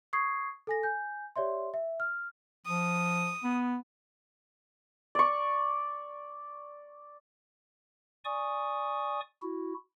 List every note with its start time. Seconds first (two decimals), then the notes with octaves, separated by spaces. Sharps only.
0.13 C#6 D#6 G#6 C7
0.67 A4 G#5 A#6
0.83 G#5 G6
1.36 G4 C#5 D5 E5 C6
1.74 E5
2.00 F6
2.67 F3 D#6
3.44 B3
5.15 D5 C#6
8.25 D5 G#5 C#6 D#6
9.42 E4 F#4